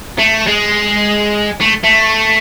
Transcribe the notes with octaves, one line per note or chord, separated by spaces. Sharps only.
A3
G#3
A3
A3